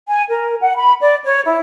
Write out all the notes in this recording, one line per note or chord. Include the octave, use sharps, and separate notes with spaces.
G#5
A#4
F#5
B5
D5
C#5
E4